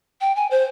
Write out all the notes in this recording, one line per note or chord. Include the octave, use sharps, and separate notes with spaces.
G5
G#5
C5